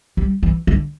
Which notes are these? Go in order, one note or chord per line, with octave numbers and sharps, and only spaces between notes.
G3
E3
D3